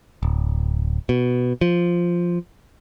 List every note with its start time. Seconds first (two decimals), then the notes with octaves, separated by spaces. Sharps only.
0.23 D1
1.09 B2
1.61 F3